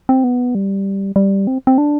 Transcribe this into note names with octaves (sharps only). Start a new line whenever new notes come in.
C4
B3
G3
G3
C4
C4
D4